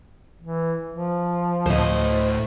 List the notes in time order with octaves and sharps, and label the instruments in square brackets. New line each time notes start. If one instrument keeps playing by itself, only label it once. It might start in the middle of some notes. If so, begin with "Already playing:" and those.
[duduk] E3
F3
[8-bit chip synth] D2 A2 [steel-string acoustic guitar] C5 D#5